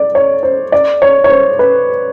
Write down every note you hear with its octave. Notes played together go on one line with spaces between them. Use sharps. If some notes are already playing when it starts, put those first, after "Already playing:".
Already playing: D5
C#5
C5
D5
C#5
C#5
C5
B4